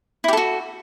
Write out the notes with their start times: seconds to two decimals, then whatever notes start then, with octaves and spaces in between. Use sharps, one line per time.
0.24 E4
0.28 G4
0.33 A4
0.37 F#4